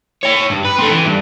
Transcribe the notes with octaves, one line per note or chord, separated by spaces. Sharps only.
C#5 G5
G2
B4
A3 C4
E3
G2